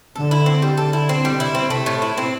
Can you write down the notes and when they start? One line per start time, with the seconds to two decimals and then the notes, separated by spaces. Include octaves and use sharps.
0.16 D3 A4
0.31 E4
0.46 C4
0.62 G3
0.78 D3 A4
0.93 E4
1.09 C4
1.25 G3
1.40 C3 E4
1.55 C4
1.70 C3 A3
1.86 A2
2.02 E4
2.18 C4